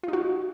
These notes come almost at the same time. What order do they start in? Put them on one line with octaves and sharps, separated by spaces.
F4 D#4 F#4